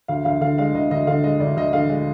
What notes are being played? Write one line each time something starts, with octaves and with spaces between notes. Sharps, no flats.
D2 F5
D2 F5
D3 F5
G#3 F5
D2 D#5
D2 D#5
D3 F5
G#3 D#5
D2 D5
D2 D#5
D3 F5
G#3 F5